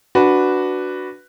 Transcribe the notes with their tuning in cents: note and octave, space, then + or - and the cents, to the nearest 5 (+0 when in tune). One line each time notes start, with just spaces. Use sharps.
D4 +0 F#4 +0 B4 +0